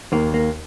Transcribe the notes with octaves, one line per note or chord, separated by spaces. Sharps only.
D#2 A#3
A#3